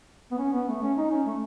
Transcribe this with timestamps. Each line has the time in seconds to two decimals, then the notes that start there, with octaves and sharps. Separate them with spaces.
0.31 B3
0.39 C#4
0.53 B3
0.68 A3
0.82 C#4
0.98 D#4
1.11 C#4
1.26 A3